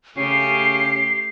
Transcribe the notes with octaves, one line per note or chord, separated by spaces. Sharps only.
C#3 A3 C#4 G4 C7